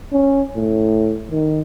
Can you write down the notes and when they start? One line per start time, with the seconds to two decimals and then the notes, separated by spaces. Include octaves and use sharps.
0.13 C#4
0.56 A2
1.30 D#3